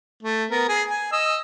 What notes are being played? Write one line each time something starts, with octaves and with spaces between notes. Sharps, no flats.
A3
B3 A#4
G#4 G#5
G#5
D#5 E6